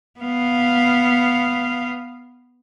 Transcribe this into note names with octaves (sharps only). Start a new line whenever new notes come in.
B3 F5